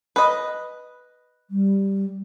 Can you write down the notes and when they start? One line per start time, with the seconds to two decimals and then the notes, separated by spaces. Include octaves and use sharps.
0.16 B4 D#5
1.50 G3